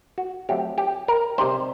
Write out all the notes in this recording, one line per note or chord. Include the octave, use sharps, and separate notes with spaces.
F#4
F#3 A3 C4 G4
G4
A#4
C3 G3 C4 D#4 C5